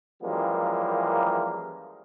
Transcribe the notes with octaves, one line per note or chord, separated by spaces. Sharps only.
F#2 E3 F3 G3 G#3 A#3